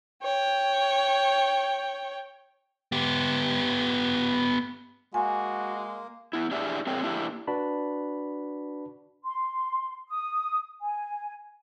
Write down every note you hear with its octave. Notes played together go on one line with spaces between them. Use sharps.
C#5 G5
B3 G4
G#3 A#3 F#4 G#5
B3 E4
D4 E4 G4 G#4 D5 E5
C4 G#4 A#4 C#5 G5
A#3 D4 E4 F4 G4
D4 F#4 B4 A5 B5
C6
D#6
G#5